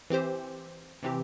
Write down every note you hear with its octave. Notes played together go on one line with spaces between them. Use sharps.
E3 C4 G4 C5
C3 E3 C4 G4